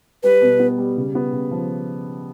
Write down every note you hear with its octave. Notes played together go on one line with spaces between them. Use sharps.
G3 B4
B2
B3
G3
C#3
B3
C#3
F3